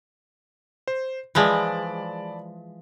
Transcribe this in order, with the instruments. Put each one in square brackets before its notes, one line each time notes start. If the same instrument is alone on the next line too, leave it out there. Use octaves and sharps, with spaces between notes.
[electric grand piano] C5
[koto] E3 F3 G#3 [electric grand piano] D5 A5 B5